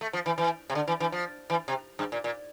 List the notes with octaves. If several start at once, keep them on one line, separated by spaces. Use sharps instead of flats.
A3
F3
E3
E3
C3
D3
E3
E3
F3
E3
C3
G2
A#2
A#2